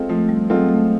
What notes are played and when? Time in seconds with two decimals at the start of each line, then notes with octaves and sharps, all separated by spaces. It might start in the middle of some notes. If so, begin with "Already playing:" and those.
Already playing: G#3 C4 F4 A4
0.09 F3 A3
0.29 G3
0.50 F#3 G#3 C4 F4 A4
0.69 A3